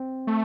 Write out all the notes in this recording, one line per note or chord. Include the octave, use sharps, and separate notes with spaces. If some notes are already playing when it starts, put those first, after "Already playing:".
Already playing: C4
A3